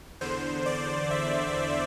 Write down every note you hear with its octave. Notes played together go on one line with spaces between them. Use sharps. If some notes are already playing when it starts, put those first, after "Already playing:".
E2 D3 C5
D5
E5